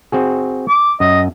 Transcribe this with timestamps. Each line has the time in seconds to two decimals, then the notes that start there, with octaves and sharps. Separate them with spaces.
0.12 C4 F#4 G#4
0.68 D6
1.00 F#2 D#5